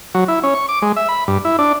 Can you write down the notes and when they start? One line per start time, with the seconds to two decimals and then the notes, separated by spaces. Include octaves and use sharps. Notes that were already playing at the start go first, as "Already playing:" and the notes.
0.14 F#3
0.28 E4
0.43 C#4
0.55 C#6
0.69 D6
0.82 G#3
0.96 E5
1.09 B5
1.28 G2
1.45 E4
1.59 D4